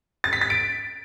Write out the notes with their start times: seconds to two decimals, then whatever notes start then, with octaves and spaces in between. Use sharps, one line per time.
0.24 A6
0.33 B6
0.41 A6
0.50 D7